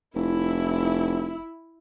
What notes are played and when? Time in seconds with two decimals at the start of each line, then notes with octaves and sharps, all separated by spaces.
0.15 F1 E4